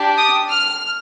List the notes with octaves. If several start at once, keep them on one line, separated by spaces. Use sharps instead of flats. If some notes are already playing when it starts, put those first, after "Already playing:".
Already playing: D4 G4
D#6
F6